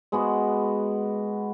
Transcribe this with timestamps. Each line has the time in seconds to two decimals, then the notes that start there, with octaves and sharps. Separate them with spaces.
0.12 G#3 B3 F#4